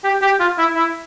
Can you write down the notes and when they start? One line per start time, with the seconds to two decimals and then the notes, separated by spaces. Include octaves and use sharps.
0.04 G4
0.22 G4
0.40 F4
0.58 E4
0.76 E4